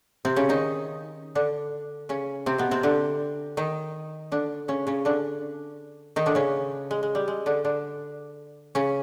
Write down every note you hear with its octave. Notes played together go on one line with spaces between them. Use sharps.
C3 C4
C#3 C#4
D#3 D#4
D3 D4
C#3 C#4
C3 C4
B2 B3
C3 C4
D3 D4
D#3 D#4
D3 D4
C#3 C#4
C#3 C#4
D3 D4
D#3 D#4
D3 D4
C#3 C#4
G#3
G#3
G3
G#3
D3 D4
D3 D4
C#3 C#4